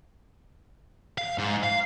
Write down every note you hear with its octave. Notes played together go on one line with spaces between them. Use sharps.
F5
G#2
F5